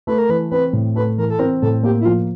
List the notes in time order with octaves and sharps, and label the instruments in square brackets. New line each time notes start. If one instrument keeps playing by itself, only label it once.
[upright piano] A3 [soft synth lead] B4
[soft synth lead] A#4
[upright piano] E3 [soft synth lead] B4
[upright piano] C4 [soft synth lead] B4
[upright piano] A2
[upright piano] A3 [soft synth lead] B4
[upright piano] E3 [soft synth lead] A#4
[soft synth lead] A4
[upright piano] C4 [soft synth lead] A#4
[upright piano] A2 [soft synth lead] A4
[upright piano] A#3 [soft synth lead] G4
[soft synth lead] E4
[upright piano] F3 [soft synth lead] F4